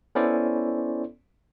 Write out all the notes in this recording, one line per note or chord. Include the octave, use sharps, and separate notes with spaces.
B3 C#4 E4 A4 C5 D5